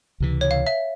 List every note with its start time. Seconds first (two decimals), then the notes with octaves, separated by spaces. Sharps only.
0.20 C#2 C3 E3
0.41 C#5
0.51 F5
0.67 E5